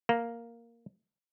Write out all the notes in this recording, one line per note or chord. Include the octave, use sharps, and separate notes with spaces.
A#3